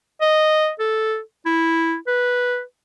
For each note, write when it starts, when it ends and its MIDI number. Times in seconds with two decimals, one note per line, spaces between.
0.22 0.71 75
0.80 1.20 69
1.46 1.96 64
2.07 2.62 71